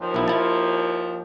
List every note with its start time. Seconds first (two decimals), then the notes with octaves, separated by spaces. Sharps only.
0.01 D#2 F3
0.14 B1 E4
0.28 E4 A5